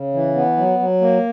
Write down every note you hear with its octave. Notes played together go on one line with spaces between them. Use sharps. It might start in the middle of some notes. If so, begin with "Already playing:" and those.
Already playing: C#3
E3
B3
F#3
F#3
A#3